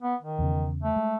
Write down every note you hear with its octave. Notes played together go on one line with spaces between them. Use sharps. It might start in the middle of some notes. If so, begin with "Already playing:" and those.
B3
D#3
E2 C#3
A3
G#3